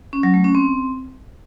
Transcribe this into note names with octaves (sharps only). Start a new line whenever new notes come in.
C#4
F#3
A3
C#4
C4